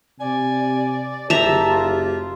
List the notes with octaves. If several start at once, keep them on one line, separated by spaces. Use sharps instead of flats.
C3 D5 G#5
F#1 G4 E5 A5 A#5
F4